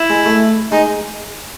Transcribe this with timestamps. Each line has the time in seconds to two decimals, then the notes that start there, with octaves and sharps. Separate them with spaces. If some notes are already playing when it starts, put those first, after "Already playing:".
Already playing: E4
0.10 G#3
0.26 A3
0.72 G#3 D#4